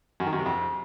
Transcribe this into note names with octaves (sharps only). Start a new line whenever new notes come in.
F#2
D#3
F#2
C3
F2